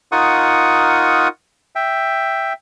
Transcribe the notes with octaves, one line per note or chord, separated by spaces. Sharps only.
D#4 F4 A#4 F#5 C#6 D#6
E5 G5